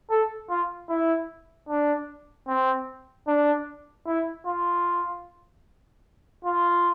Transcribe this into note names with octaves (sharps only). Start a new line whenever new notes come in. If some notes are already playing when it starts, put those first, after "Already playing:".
A4
F4
E4
D4
C4
D4
E4
F4
F4